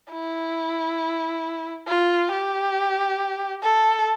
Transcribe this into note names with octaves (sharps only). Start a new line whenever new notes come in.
E4
F4
G4
A4